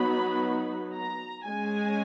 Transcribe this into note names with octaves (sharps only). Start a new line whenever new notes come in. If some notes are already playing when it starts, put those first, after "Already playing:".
Already playing: F#3 B3 D#4 B5
A#5
G#3 C#4 G#5